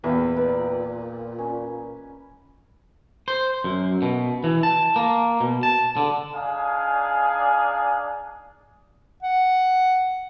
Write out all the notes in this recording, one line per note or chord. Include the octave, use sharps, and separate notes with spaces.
E2 A#2 B4 E5 G5
D#4 B4 D5
C#4
C5
F#2
B2
E3
A5
A#3
B2
A5
D3
D4 D#4 G#4 F5 G#5
F#5